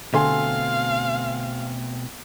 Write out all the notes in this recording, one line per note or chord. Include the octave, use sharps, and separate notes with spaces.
B2 D3 A3 C4 A4 F5 G#5 C6